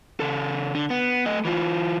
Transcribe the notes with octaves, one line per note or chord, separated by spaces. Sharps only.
C#3 A4
D3
B3
A3 D#5
E3 F4